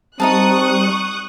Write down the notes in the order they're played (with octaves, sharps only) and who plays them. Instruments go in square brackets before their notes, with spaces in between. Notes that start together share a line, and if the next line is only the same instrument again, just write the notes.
[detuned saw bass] G3 [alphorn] C4 [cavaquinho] D#4 A#4 A5 [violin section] C#6 D#6 F#6